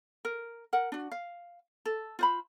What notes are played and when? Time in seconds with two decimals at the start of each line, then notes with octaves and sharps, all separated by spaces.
0.25 A#4
0.73 A#4 F#5
0.92 D4 F#4
1.11 F5
1.86 A4
2.19 F4 C5 B5